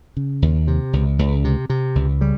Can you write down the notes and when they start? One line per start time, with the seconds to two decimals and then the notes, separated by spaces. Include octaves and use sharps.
0.17 C#3
0.42 D#2
0.68 C3
0.93 C#2
1.19 C#2
1.44 C3
1.70 C3
1.95 C#2
2.21 C#3 G3